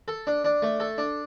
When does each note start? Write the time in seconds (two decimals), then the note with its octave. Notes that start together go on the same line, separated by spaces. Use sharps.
0.08 A4
0.27 D4
0.45 D4
0.62 A3
0.80 A4
0.98 D4